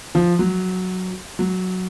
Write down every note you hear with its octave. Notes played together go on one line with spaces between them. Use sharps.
F3
F#3
F#3